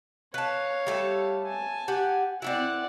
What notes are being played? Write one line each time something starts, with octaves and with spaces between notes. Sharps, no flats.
B4 C#5 F5 A5
G3 A3 A4
G#5 A5
G4 F#5
C4 C#4 E4 D5 F#5